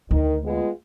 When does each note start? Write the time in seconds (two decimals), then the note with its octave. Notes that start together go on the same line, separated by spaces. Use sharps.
0.11 D2 D#3
0.44 G#3 B3 F4